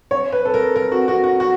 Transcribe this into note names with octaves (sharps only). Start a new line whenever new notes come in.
C#5
B4
A4
A#4
A#4
F#4
F#4
F#4
F#4